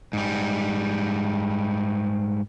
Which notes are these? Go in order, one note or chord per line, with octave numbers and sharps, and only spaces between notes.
G#2 G3